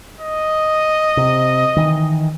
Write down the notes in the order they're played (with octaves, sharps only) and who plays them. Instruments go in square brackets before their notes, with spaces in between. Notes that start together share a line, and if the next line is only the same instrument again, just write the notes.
[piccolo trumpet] D#5
[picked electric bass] C3
D#3 E3